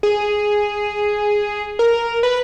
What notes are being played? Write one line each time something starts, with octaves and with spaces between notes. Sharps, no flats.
G#4
A#4
B4